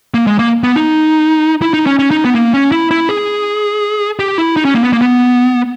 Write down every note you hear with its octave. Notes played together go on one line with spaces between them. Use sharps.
A#3
G#3
A#3
B3
D#4
E4
D#4
C#4
C#4
D#4
B3
A#3
C#4
E4
E4
G#4
G4
E4
D#4
C#4
A#3
B3
A#3
B3